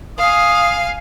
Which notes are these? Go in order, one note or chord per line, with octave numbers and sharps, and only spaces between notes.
F5 G#5 D#6